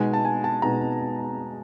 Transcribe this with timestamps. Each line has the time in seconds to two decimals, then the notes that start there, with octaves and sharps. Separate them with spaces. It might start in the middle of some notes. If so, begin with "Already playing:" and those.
Already playing: B2 G#3 B3 D#4 G#5
0.13 A5
0.25 G#5
0.44 A5
0.62 B2 G#3 B3 D#4 A#5